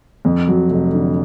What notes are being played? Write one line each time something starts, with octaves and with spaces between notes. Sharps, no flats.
F2
F#3
F1
D3